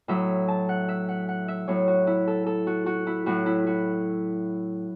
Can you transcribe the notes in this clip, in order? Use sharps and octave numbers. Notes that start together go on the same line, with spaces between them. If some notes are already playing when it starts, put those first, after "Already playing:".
A2 F#3 E5
A5
F#5
E5
F#5
F#5
E5
A2 F#3 C#5
F#4
E4
A4
A4
F#4
F#4
E4
A2 F#3 F#4
E4
F#4